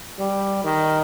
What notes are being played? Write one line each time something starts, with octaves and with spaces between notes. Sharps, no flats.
G3
D#3